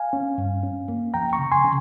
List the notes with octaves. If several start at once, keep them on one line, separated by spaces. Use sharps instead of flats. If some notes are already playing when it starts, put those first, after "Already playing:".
Already playing: F5 G#5
C#4
G2
C#4
A#3
F3 G5 A#5
A#5 C#6
C#3
G#5 C6
C#3